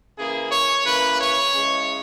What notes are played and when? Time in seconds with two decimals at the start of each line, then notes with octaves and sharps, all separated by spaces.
0.17 C#3 E3 A#3 G#4
0.51 C#5
0.85 C#3 E3 A#3 B4
1.19 C#5
1.54 C#3 E3 G#3